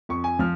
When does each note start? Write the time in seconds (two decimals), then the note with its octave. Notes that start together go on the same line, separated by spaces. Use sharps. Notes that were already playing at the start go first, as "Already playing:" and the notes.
0.09 F2 C#6
0.24 G#5
0.39 F3 F6